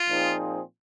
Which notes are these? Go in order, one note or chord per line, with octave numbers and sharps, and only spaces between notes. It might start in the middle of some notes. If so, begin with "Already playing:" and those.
Already playing: F4
A#2 F3 C4 D#4 G#4